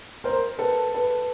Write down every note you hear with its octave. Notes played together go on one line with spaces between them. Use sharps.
A#4 C5
A4 B4
A4 B4